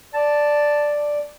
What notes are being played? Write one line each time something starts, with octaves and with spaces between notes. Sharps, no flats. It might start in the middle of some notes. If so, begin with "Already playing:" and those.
D5 A5